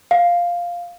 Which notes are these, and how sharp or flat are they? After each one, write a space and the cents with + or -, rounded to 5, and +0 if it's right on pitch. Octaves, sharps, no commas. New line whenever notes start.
F5 +0